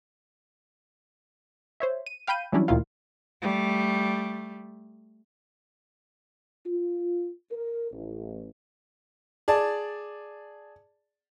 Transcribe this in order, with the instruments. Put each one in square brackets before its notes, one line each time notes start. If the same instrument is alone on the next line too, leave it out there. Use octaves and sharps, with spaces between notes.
[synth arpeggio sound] C5 C#5 E5
D#7
F5 G5 B5 G6 D#7
E3 F#3 G3 C#4 D4 E4
D2 A#2 D#3 E4 F4 F5
[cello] G3 A3
[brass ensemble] F4
A#4
A1
[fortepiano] G#4 D5 A5